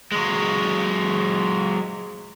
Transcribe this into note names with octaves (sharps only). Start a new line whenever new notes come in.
F#3 G#3